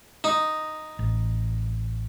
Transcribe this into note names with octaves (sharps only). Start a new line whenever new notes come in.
D#4
A1